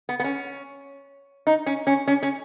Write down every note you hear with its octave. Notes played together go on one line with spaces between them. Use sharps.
B3
B3
C#4
D#4
C#4
C#4
C#4
C#4